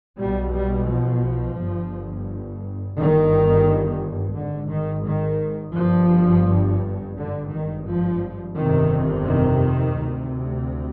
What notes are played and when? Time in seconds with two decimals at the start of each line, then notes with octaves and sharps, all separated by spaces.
0.17 B1 B2 G3
0.52 G3
0.87 F3
1.58 G1 G2
2.96 G1 G2 D#3
4.37 G#1 G#2 D3
4.71 D#3
5.07 D#3
5.76 G1 G2 F3
7.17 G#1 G2 D3
7.51 D#3
7.87 F3
8.56 G1 F2 C3 D#3
9.26 D#3
9.97 D2 C3